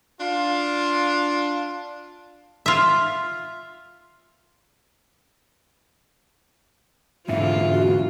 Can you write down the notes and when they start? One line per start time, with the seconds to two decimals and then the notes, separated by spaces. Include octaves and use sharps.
0.20 D4 F4
2.66 F4 E5
7.28 E2 G#2 D3 F4 E5
7.72 F#4